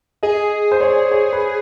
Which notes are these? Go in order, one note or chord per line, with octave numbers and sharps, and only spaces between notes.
G#4 D#5
C5
C#5
D5
C#5
B4